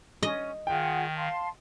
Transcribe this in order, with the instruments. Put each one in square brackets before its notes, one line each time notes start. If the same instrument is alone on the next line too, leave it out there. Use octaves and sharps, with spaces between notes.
[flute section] C#4 [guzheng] D#5
[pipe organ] D#3 [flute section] F4 G#4 F#5 [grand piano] G5
[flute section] F5 A5 C6